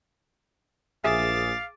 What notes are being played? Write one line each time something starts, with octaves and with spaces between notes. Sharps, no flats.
A#1 G#4 E5 F5 D6 A6